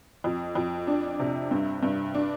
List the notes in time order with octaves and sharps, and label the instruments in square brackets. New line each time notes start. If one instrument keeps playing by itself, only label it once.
[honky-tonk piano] F2
F2
D4
C3
G2
G2
D4